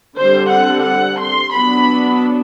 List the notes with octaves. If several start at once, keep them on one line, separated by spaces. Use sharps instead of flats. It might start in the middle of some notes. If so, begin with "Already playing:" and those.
D3 G3 C4 C5
F#5
F#5
C6
F#3 B3 D4 B5